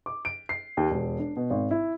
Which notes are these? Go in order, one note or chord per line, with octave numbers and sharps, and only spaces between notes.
D6
D7
C7
D#2
E1
D4
B2
G#1
E4